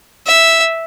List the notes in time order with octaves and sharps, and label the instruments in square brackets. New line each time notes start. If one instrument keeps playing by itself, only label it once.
[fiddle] E5